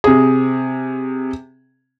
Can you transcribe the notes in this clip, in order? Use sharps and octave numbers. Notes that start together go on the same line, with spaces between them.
C3 G#4